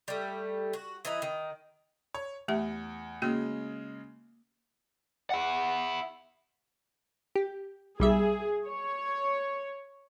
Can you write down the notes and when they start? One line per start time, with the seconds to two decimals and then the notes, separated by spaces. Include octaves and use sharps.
0.08 G3 A3
0.73 F#4
1.05 E3 D#4 E4
1.22 D#3
2.15 C#5
2.48 E2 A3 G4 E5
3.22 C#3 G#3 A#3 F#4
5.30 E4 F#5
7.36 G4
8.00 B1 G3 G#4 E5
8.67 C#5